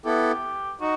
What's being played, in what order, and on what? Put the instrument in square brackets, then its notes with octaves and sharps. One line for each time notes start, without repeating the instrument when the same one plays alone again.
[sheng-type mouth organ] B3 E4 A4 [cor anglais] G4
[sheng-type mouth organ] D#4 [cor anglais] F#4